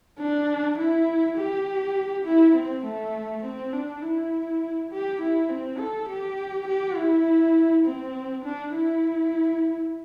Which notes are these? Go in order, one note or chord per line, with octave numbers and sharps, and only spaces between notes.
D4
E4
G4
E4
C4
A3
C4
D4
E4
G4
E4
C4
A4
G4
G4
E4
C4
D4
E4